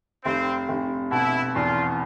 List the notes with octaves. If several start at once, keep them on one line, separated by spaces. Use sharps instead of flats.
F1 C4
F1
B2 E4
E2 F4